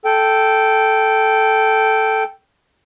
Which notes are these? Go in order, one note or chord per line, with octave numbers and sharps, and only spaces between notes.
A4 G5